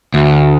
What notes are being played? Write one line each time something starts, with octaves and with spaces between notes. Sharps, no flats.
D2